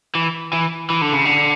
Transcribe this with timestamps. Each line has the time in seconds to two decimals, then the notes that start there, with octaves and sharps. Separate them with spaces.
0.15 E3
0.53 E3
0.90 E3
1.02 D3
1.13 C#3
1.25 D3